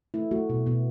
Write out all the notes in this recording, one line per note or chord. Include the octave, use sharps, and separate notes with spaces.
A3 E4
A3 F#4
B2
B2 B3